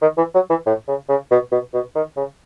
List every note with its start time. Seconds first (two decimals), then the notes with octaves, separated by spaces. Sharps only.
0.02 D#3
0.17 E3
0.34 F#3
0.50 E3
0.66 A2
0.88 C#3
1.09 C#3
1.31 B2
1.52 B2
1.74 B2
1.95 D#3
2.17 C#3